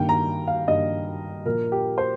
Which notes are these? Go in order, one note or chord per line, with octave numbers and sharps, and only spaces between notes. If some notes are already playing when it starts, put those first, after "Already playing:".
Already playing: G2 D#3 A#3 G5
A#5
F5
G2 D#3 A#3 D#5
A#2 F3 A#3 A#4
G4
C5